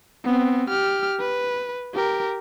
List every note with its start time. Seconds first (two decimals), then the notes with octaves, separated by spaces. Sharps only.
0.24 B3 C4
0.69 G4 F6
1.20 B4
1.94 G4 A#4